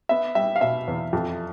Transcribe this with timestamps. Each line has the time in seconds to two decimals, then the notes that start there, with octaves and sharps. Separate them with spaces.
0.09 B3 E5
0.35 G3 E5
0.56 F5
0.61 B2 E5
0.88 E2
1.13 F2